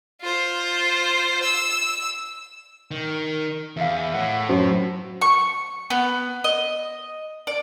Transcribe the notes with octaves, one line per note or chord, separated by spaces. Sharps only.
F4 C5
E6
D#3
E2 E5 F5
A2 F#5
F#2 C5
C#6
B3
D#5
D5